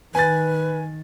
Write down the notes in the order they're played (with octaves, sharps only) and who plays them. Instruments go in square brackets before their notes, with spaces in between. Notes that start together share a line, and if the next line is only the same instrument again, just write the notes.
[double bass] D#3 [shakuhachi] B4 [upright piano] G#5 A6